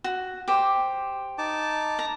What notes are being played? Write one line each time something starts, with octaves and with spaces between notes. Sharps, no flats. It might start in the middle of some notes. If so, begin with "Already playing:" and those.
F#4
G4 C5
D#4 A5 D6
A#5